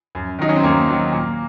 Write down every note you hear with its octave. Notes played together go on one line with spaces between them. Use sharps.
F#2
D#3 F#3 D#4
C#4
C4
F#2 A#3
D#3 F#3
A#2